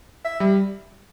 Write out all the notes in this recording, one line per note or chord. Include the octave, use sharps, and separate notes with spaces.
E5
G3